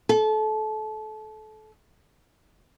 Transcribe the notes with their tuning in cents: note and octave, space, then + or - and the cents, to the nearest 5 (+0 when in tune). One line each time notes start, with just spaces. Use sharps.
A4 -25